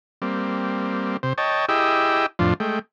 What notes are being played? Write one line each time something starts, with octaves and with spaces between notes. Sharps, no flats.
G3 A#3 C4
C3 C5
C#5 D#5 G5 A5
E4 G4 G#4 D#5 G5 E6
F2 A2 F3 D4 F4
G#3 A3 G5